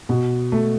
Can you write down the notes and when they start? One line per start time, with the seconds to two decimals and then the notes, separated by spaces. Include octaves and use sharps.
0.09 B2
0.52 A3